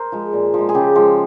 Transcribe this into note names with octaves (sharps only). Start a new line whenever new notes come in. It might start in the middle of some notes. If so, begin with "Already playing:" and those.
Already playing: A#4 C5
F3 G#3
A#2
F3 G#3
G#4
C#3 G4
F3 G#3